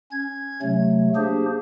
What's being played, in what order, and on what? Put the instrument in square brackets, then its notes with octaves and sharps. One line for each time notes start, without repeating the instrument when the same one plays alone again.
[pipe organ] C#4 G#6
C3 F#3 A3
A#3 D4 G4 G#4 C5